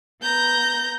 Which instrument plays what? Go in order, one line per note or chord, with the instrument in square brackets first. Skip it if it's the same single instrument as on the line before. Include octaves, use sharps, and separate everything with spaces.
[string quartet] B3 A#5 G6 A#6